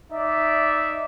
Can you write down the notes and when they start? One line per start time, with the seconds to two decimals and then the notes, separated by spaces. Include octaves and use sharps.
0.12 D#4 D5 E5